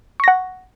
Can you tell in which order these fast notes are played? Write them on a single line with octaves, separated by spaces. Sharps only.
C#6 A#6 F#5